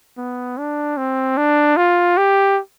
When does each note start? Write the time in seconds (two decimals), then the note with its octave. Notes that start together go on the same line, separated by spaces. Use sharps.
0.18 B3
0.58 D4
0.97 C4
1.37 D4
1.77 F4
2.17 G4